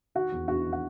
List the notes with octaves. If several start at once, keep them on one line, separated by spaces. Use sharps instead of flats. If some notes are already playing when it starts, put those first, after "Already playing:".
D#3 F#4 F#5
E2
E2 F#4 F#5
D#3
F#5